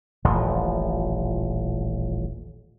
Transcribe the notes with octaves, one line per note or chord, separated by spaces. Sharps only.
D#1 A1 A#2 F3